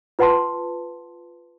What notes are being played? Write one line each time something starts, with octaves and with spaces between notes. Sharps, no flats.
F4 B4 F#5 A5 C6